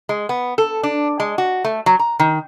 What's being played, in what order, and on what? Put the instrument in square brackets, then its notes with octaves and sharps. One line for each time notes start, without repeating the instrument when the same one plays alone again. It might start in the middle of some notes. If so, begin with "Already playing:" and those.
[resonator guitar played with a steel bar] G#3
B3
A4
D4
G#3
F#4
A3
F#3
A#5
D#3